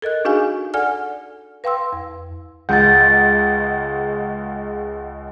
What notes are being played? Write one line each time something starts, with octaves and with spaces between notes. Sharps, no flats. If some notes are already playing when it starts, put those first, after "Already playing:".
A4 A#4 D#5 F#6
D4 D#4 F#4 G#4 F5 G#5
A4 D5 F#5 G#5 F6
B4 F5 G5 C6 E6
F2
C#2 G#3 F#5 G6 A6